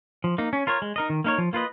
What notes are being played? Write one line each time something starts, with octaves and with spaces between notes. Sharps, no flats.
F3
A#3 D#4
C#4
F4 A#4 C#5
G#3
D#4 A#4 D#5
D#3
A#3 D#4 A#4 C#5
F3
A#3 F4 B4 D#5